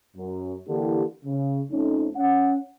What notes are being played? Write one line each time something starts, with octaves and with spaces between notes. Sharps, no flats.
F#2
D3 E3 A#3 D4 E4 G4
C#3
F2 A3 C#4 D#4
C#4 F#5